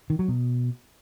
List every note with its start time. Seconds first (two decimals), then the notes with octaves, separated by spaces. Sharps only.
0.10 D#3
0.19 F#3
0.28 B2